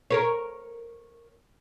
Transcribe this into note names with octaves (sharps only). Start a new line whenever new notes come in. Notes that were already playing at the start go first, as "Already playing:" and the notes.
A#4 B4 C#5